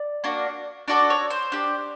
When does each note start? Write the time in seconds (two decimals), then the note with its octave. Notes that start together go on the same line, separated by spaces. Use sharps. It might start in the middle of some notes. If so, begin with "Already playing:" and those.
Already playing: D5
0.24 A#3 D4 F#4
0.88 D4 F#4 A4 D5
1.10 C#5
1.30 C5
1.52 D4 G4